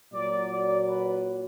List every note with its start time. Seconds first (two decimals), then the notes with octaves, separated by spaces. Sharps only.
0.12 A#2 F#3 D5
0.49 D5
0.86 B4